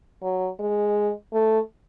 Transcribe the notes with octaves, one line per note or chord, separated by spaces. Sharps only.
F#3
G#3
A3